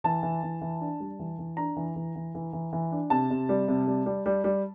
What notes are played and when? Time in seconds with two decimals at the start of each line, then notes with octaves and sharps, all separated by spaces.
0.04 E3 A5
0.23 E3
0.43 E3
0.61 E3
0.81 D4
1.00 G3
1.19 E3
1.39 E3
1.57 D4 A#5
1.76 E3
1.96 E3
2.15 E3
2.35 E3
2.53 E3
2.73 E3
2.92 D4
3.10 C3 A5
3.30 C3
3.49 G3
3.68 C3
3.87 G3
4.06 G3
4.26 G3
4.44 G3